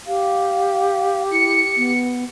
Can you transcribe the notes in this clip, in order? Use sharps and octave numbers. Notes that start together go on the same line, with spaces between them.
G4 F5
E4 C#7
B3